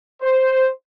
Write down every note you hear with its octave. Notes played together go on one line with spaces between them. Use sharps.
C5